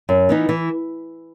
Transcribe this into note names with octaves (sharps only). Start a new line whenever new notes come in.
F#2
E3 B3 D#4
E3